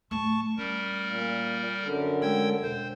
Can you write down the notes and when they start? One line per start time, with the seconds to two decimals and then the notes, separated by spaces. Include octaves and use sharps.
0.11 D1 A3 A5 C#6
0.58 G3 C#4 A#4
1.06 A#2
1.82 F#2 D3
2.22 G#3 G5 E6 G#6
2.63 E1 C5